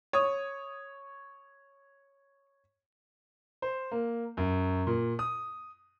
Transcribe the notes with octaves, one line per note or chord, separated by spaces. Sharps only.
C#5 D#6
C5
A#3
F#2
A#2
D#6